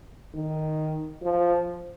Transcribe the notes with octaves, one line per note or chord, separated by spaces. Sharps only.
D#3
F3